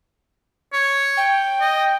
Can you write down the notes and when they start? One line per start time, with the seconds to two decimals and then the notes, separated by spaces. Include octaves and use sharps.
0.73 C#5
1.17 G5
1.61 D#5